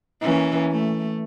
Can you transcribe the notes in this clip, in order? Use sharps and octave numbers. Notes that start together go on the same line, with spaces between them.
E3 A#3 C#4
A3